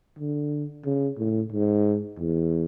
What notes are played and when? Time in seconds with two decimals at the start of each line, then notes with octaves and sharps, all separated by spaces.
0.19 D3
0.85 C#3
1.18 A2
1.52 G#2
2.19 E2